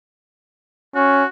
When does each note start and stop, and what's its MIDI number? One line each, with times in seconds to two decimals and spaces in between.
0.95 1.24 61
0.95 1.27 66